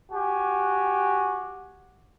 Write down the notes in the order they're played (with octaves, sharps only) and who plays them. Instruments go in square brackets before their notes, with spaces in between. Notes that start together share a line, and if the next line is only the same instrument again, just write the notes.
[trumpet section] F#4 G4 G#5